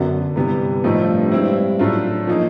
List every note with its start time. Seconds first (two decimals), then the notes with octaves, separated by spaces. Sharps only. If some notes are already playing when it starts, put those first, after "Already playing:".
Already playing: F#2 D3 F#3 B3
0.36 G2 C3 E3 G3 B3
0.84 A2 F3 A3 C4 D#4
1.32 G#3 C4 E4
1.79 A2 F#3 A3 D4 F4
2.27 F3 A#3 D#4 G#4